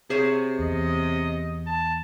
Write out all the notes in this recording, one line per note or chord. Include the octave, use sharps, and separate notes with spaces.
C3 G#4 C5 C#5
E2 D#5
A5